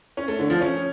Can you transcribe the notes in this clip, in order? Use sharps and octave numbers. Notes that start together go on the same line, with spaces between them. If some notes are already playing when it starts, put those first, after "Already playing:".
C#4
A3
D3
F3
C#4